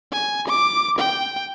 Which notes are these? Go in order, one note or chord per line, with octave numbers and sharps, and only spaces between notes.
G#5
D6
G5